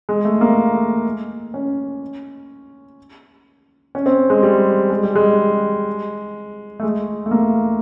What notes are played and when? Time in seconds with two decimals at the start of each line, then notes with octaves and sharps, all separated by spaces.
0.09 G#3
0.25 A3
0.41 A#3
1.54 C#4
3.95 C#4
4.06 C4
4.30 G#3
4.43 G3
4.90 G#3
5.03 G3
5.15 G#3
6.80 A3
6.83 G#3
7.26 A3
7.31 A#3